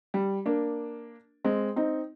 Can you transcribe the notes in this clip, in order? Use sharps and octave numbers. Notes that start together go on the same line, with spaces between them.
G3
A#3 D4
G#3 C4
C4 D#4